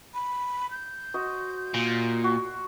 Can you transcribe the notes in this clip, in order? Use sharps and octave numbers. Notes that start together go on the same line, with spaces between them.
B5
G6
F#4 C5 D#5
A#2 C6
F#4